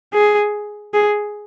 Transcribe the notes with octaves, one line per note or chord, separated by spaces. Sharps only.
G#4
G#4